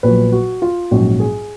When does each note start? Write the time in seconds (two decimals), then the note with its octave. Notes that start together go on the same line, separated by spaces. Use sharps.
0.03 A#1 A#2 F#3 B3 B4
0.32 F#4
0.62 F4
0.91 A#1 G#2 F#3 C#4 F#4
1.20 G#4